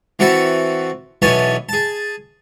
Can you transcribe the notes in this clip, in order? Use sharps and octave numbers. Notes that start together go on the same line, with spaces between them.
E3 C4 F#4 A4 F#5 B5
B1 E3 B3 C#5 G#5 A5
G#4 A5